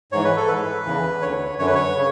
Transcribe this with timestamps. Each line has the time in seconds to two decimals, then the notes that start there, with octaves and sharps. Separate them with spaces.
0.12 G#2 E3 C#5
0.24 B4
0.36 A4
0.48 G#2 E3 B4
0.85 E2 C#3 E3
1.22 D2 D3 C#5
1.58 F#2 D3 C#5
1.66 B4
1.75 C#5
1.96 C#3